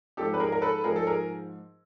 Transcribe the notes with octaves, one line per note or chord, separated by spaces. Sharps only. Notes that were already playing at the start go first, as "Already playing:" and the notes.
G#2 F3 G4 A4
B4
G#4 A#4
A#4
A4 B4
G#2 F3 G#4 A#4
A4
G#4 A#4